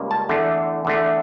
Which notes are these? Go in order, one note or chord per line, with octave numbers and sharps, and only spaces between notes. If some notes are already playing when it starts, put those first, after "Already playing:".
Already playing: C#2 C#3 G3 A#3
A5
E2 D3 A3
E2 D3 A3